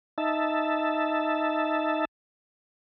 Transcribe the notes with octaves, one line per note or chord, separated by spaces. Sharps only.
D#4 E5 A5